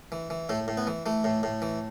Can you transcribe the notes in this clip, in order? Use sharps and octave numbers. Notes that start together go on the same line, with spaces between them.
E3
E3
A2 A3
A2
B3
E3
E3 A3
A2
A2
E3